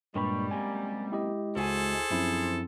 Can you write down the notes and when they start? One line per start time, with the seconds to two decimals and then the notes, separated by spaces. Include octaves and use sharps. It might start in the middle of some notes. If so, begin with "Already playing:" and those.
0.15 G2 A#2 G3 G#3 A#3 C#5 B5
0.51 F#2 C3 A#3 G#5
1.12 E4 G4 D#5
1.56 C#2 E4 F#4 G#4 A4 C5 G#5
2.11 F#2 F3 C4 E4